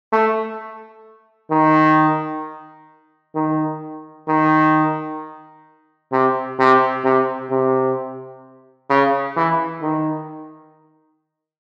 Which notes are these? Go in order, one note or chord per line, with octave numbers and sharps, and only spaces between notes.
A3
D#3
D#3
D#3
C3
C3
C3
C3
C#3
E3
D#3